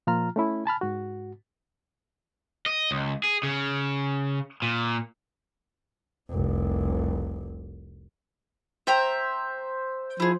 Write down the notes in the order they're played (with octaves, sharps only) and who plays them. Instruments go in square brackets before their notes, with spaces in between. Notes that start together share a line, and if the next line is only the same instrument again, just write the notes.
[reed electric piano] A#2 F3 F4 A#5 F6
A3 C#4 E4
G#5 A5 B5 F6
G#2 F#4
[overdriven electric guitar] D#5
C#2
G#4
C#3
A#2
[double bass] F1 C2
[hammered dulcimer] C5 [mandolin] E5 G5 A#5
[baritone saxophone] F3 [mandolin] E4 G#4